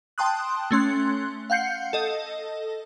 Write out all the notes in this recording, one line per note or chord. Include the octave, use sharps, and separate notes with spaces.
G5 A5 C6 D#6 F#6
A3 C#4 C6 F#6
F5 F#5 G6 C7 C#7
A4 D#5